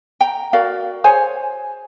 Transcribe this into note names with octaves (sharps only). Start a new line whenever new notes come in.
G5 A#5
F#4 A#4 D5 F5
G#4 C5 C#5 G#5